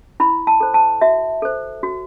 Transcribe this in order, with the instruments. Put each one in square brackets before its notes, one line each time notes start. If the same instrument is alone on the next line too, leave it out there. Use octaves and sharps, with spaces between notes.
[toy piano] E4 B5
A5
A4 C5
A5
F#4 E5
A4 C5
F#4